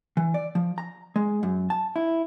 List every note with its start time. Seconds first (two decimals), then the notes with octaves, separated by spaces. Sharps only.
0.17 E3
0.34 D5
0.55 F3
0.78 A#5
1.16 G#3
1.43 F#2
1.70 A5
1.96 E4